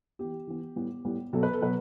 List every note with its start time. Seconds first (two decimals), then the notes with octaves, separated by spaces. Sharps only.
0.19 E3 B3 G4
0.47 E3 B3
0.76 A2 G3 B3
1.05 A2 G3 B3
1.33 B2 F#3 B3 A4
1.43 B4
1.53 A4
1.61 B2 F#3 B3 B4